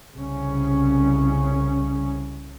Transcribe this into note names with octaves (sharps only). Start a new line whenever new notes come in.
C2 C#3 C#4